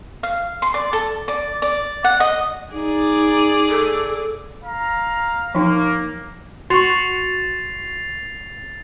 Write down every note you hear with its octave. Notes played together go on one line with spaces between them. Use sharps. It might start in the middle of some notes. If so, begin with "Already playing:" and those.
F5
C6
D5
A4
D5
D5
F#5
D#5
D#4 G#4 D5
A4
F5 A#5
F3 A#3 D#4
F#4 C6 C#6 A6 C7 F7